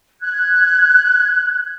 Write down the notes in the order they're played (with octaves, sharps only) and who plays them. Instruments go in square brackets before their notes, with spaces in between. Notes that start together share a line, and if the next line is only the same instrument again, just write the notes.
[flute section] F#6 G#6